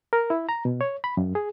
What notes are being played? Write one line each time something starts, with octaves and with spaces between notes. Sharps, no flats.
A#4
E4
A#5
B2
C#5
B5
F#2
G#4